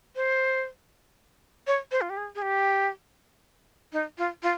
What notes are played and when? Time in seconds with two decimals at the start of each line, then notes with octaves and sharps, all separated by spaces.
0.16 C5
1.67 C#5
1.92 C5
2.01 F4
2.10 G4
2.17 G#4
2.35 G#4
2.42 G4
3.92 D#4
4.18 F4
4.43 F4